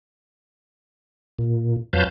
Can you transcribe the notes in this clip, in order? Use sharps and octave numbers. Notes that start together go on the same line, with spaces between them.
A#2
F2 F#3 B4 F5 A5 G6